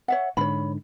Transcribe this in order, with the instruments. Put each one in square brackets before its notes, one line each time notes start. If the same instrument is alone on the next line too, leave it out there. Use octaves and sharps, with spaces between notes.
[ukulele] C#5 E5 F#5
[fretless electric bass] G#2 D3 [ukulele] C#5 B5